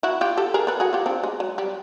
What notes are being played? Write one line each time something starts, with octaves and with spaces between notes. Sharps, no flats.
E4 F#4
F4 G4
G4 A4
G#4 A#4
A4 B4
F#4 G#4
F4 G4
C4 D4
G#3
F#3
G3